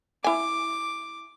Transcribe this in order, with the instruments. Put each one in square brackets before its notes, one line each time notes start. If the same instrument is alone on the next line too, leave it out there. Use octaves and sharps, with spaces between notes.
[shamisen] E4 G#5 [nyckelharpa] D6